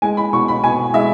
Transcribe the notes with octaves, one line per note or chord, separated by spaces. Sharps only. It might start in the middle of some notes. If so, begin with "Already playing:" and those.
G#3 G#5
B5
B2 C#6
B5
B2 G#5
G#3 E5